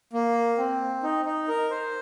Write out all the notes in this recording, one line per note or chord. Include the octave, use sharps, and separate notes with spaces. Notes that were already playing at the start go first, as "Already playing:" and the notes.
A#3
C4
D#4
D#4
A#4
C5